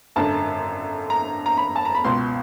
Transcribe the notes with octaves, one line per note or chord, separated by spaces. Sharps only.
G#1 F#2 D3 A5
A#5
A#5
B5
A5
A#5
B5
C#2 B2 C6